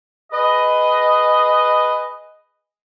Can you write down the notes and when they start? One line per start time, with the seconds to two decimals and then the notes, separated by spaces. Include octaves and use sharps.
0.32 G#4 B4 D#5